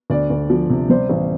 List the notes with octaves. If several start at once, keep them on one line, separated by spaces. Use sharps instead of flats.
D2 D5
D2
F3
C3
G3 C5
A1